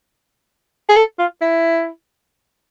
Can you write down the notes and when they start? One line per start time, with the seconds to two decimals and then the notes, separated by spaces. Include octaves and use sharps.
0.89 G#4
0.96 A4
1.19 F4
1.41 E4